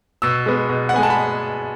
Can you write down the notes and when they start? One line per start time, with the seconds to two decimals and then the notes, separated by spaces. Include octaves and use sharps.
0.22 B2 E6
0.46 G#3 B3
0.69 B2
0.89 F#5
0.94 G#3 B3 G#5
1.03 A5
1.10 B5